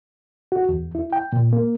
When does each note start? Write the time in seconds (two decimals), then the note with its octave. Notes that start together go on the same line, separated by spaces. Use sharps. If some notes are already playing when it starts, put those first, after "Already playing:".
0.52 F#4
0.69 E2
0.95 E4
1.13 G5
1.33 A#2
1.53 A#3